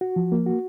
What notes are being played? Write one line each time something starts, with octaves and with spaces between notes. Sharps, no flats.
F#4
F3
A#3
F#4